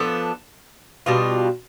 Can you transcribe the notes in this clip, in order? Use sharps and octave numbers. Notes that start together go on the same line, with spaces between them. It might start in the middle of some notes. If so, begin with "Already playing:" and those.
Already playing: F3 B3 D4 A4
B2 G3 D4 F4